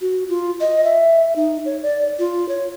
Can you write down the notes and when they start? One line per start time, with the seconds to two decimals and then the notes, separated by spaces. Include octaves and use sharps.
0.01 F#4
0.29 F4
0.61 D#5
0.84 E5
1.36 D#4
1.65 C#5
1.83 D5
2.19 F4
2.49 C#5